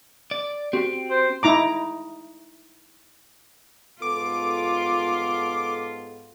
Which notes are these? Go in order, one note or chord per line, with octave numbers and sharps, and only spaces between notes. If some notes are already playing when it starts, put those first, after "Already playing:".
D5
C4 F#4 G4 G5
C5
D#4 E4 A#5 D6
G#2 B3 F4 A4 D6